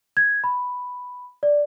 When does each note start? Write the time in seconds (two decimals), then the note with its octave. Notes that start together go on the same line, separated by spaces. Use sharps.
0.17 G#6
0.44 B5
1.43 D5